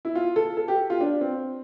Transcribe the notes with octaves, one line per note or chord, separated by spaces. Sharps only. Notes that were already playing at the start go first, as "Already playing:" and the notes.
E4
F4
A4
A4
G4
F4
D4
C4